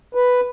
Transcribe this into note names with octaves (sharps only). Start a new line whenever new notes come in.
B4